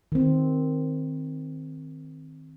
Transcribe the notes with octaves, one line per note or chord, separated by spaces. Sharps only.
D#3 C4